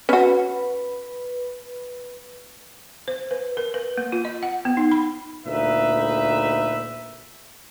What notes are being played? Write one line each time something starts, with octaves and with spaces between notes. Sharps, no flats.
C#4 F#4 B4
C5
B4
A#4
B4
A#3
F4
D#5
F#5
B3
D#4
B5
D2 A#2 D#4 B4 E5